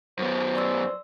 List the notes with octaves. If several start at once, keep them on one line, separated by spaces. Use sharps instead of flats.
F#2 B3 C5
D5 C6 E6